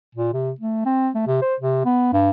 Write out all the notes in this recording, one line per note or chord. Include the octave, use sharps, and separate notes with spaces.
A#2
C3
A3
C4
A3
C3
C5
C3
B3
G2